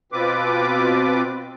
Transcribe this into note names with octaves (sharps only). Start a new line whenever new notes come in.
B2 C4 F4 B4 D6